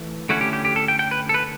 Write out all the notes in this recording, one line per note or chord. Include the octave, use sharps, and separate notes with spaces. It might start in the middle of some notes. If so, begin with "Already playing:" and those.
Already playing: E3 A3
D3 A3 C#4 E4 F#4
G4
G4
G4
A4
G5
G5
B4
A4
B4